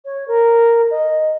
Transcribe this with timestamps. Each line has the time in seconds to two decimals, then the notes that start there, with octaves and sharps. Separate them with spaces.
0.05 C#5
0.28 A#4
0.91 D#5